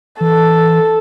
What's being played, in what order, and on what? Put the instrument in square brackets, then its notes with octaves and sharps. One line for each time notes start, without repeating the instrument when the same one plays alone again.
[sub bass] E3 [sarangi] A4